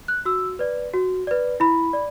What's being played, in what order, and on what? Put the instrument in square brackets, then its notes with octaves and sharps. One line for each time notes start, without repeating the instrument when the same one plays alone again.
[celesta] F#6
F#4 E6
B4 D5
F#4
B4 D5
E4 B5
D5